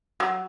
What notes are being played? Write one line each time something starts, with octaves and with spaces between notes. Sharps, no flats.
F#3